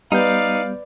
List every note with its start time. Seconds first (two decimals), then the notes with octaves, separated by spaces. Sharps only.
0.12 G3 B3 D#4 B4 D5 F5 G6